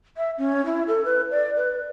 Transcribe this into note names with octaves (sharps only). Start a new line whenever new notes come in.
E5
C#4
E4
A4
B4
D5
B4